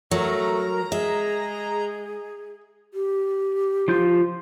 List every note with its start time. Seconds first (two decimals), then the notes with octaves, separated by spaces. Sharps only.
0.11 F#3 A3 A#4 A#5
0.92 G#3 G#4 E5
2.94 G4
3.88 F3 F4 G6